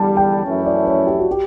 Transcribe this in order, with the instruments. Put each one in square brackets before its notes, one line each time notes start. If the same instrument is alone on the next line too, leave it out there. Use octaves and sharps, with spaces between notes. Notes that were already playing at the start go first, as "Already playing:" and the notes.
Already playing: [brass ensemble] E2 D3 G3 [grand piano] A5
[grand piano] G5
[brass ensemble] F#2 E3 A3 C#4 E4
[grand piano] D5
C#5
G4
F#4
G4